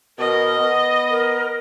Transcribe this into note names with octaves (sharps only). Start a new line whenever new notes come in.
B2 A#4 D#5
B3
A#4